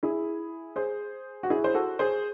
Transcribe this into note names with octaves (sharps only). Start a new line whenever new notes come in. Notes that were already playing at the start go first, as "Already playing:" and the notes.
E4 G#4
G#4 C5
F#4
E4 G#4
C5
F#4 A4
G#4 C5